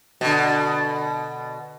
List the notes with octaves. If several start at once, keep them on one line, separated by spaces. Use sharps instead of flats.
B2 D3